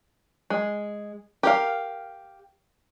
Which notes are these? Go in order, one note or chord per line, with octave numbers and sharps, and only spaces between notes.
G#3
G4 A#4 F5